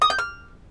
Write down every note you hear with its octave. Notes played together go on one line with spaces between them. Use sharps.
D#6
G6
F6